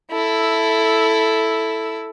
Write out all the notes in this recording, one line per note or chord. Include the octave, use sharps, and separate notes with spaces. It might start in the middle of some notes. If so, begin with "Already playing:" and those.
E4 A4